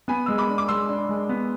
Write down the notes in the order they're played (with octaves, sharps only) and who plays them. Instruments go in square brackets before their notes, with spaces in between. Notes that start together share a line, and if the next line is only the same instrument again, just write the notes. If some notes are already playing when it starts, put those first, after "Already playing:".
[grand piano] B3 [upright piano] G#5 B5
[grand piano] G#3 [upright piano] E6
[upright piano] B5 D6
[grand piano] D4
[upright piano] D6
[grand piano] G#3 [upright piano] C6 E6
[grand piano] D4
G#3
B3